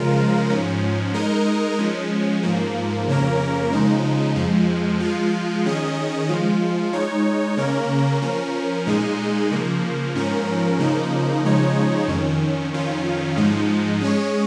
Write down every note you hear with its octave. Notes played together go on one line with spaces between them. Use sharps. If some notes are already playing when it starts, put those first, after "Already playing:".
Already playing: C#3 F3 G#3 F4 A#4
G#2 F3 C#4
G#3 D#4 A#4 D#5
F3 G#3 C#4
G#2 F3 A#3
F2 C#3 A#3 C#4 A#4
C#3 F3 G#3 D#4
F2 F3 G#3
F3 G#3 F4
D#3 C#4 G#4 D#5
F3 G#3 F4
G#3 D#4 C#5
C#3 A#3 C#4 A#4
F3 C#4 A#4
A#2 G#3 D#4 G#4
C#3 F3 A#3
G#2 F3 C#4 A#4
C#3 F3 A#3 D#4
C#3 F3 G#3 D#4 C#5
F2 D#3 C#4
F2 D#3 C#4 F4
G#2 F3 G#3 D#4
G#3 C#4 G#4 C#5